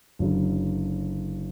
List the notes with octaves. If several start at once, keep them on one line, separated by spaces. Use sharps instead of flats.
F#1 F#2 D3